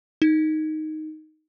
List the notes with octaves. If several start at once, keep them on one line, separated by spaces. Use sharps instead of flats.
D#4